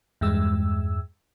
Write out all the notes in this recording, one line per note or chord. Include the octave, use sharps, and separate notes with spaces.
E2 G2 G#3 E6